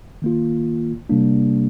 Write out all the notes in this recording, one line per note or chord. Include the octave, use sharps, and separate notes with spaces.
D#3 A#3 F4
C3 G3 A#3 D4